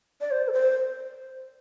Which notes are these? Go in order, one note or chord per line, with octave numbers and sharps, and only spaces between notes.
D5
C5
A4
C5